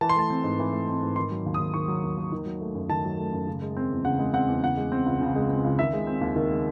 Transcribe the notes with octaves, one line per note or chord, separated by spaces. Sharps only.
E3 A5
C6
A3 A5
C4
G#2
E3
A3
C4
G#2
D#3 C6
F#3
D#2
D#6
D#2
D#3 C#6
F#3
D#2
D#2
D#3
F#3
A3
F#2
D#3 A5
F#3
A3
F#2
C#3
G#3
C4
E2
C#3 F#5
G#3
C4 F#5
E2
C#3 F#5
G#3
C4
C#2
C#3
G#3
C4
C#2
D#3 E5
G#3
C4
D#2
D#3
G#3